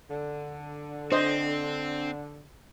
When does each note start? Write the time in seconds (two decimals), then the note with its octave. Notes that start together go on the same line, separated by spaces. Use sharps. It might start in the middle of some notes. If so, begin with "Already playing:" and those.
0.11 D3
1.12 C4 D4 C5 D#5